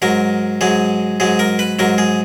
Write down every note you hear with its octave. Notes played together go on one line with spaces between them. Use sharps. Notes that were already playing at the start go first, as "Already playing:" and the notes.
G#2 F#3 A#4
G#2 F#3 G#4
G#2 F#3 G#4
A#4
B4
G#2 F#3 A#4
G#4